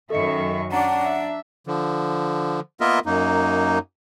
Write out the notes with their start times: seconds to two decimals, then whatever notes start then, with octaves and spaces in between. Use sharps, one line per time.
0.10 F#2 D#3 A4 D#5 E5 C#6 C#7
0.72 C#4 D4 F#5 A#5
1.04 E5
1.67 D3 F3
2.80 A#3 B3 F4 A#4 D#5 E5
3.06 F#2 A#3 D#4